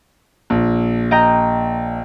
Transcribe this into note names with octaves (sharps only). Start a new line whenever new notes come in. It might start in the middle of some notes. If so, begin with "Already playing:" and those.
A#1
D#5 G5 A#5